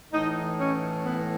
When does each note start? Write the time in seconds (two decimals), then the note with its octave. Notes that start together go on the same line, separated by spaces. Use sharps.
0.12 A2 E3 D#4
0.57 C#4
1.02 B3